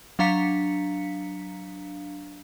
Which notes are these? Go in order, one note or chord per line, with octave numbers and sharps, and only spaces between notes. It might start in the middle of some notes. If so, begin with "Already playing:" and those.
F#3 D4 F5 A#5 B6 C#7